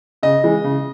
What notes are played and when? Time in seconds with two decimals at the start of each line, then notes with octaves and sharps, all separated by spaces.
0.23 C#3 D#5
0.44 E3 G#3
0.64 C#3